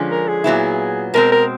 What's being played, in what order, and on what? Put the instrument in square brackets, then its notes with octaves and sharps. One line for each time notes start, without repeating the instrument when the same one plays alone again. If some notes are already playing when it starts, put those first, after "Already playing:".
Already playing: [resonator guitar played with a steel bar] D3 F3 G#3 C#4
[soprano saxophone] A#4
G#4
[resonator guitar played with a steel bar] A#2 F#3 B3 E4
[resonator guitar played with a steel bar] B2 G#3 C4 [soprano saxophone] A#4
[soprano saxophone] A#4